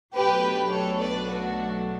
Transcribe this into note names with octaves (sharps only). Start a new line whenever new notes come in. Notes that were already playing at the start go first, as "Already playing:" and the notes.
B1 B2 F#3 A3 D4 G4 B4
A4 C#5
B4 D5
F#4